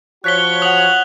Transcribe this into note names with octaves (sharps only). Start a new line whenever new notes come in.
F3 F#4 C#5 F#6 B6 G7
F#5 D#6 F#6 F7 F#7